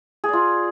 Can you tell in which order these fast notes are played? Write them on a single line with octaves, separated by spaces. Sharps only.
G#4 D5 F4